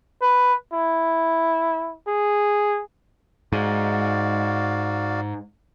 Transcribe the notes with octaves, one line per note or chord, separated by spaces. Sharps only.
B4
E4
G#4
G#2 F#4 D5 F5